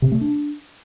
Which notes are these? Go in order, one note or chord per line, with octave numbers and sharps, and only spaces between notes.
C3
A3
D4